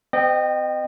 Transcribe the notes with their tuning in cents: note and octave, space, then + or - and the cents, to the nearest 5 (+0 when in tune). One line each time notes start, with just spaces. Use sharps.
C4 -35 D#5 -25 G5 +0